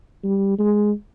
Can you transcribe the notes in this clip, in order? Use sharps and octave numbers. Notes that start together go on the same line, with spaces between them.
G3
G#3